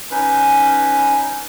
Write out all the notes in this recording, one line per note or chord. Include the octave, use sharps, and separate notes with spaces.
C#4 D#4 B4